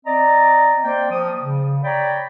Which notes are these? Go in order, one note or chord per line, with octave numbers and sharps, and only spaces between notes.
C4 D5 D#5 A#5
A#3 C5 D5 G5
F3 D#6
C#3
C#5 D5 G5 A#5 B5